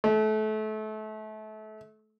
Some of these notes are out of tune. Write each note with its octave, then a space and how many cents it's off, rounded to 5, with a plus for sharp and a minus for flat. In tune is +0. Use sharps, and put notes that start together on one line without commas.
A3 -30